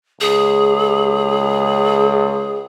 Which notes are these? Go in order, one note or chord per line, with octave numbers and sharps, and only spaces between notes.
C#2 G#4